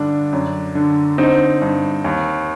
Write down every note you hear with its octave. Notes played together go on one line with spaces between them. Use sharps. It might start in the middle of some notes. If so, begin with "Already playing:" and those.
Already playing: G2 D3 D4
F#2
D3
D3 C4 D#4
G2
D#2